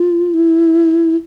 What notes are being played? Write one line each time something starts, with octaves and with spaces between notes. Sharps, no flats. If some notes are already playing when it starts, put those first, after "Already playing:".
Already playing: F4
E4